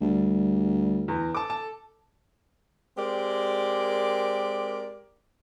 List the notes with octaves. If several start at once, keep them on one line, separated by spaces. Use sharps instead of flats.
D2 G3
E2 A#5
A4 A5 D6
A5
G#3 C4 G4 A#4 D5